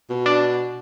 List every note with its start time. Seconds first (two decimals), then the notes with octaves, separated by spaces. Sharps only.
0.10 B2
0.26 D4